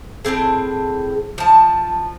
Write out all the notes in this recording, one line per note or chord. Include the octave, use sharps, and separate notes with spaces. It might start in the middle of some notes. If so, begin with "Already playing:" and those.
A2 A#3 C4 G#4
F3 A5